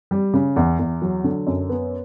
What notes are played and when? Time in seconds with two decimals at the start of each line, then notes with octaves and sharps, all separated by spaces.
0.11 G3
0.34 C#3
0.56 E2
0.79 E2
1.02 F#3
1.24 D3
1.47 F#2
1.70 B3